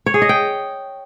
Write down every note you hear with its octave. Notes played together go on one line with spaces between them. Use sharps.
C#5
G#4
D#5
G5